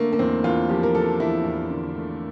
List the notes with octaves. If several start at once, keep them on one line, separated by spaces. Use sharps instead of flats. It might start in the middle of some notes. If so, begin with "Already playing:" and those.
Already playing: D3 A3 A#3
A#3
E2 C4
E2 F4
F3 G4
A#4
F3 A4
E2 E4
E2
D3
A3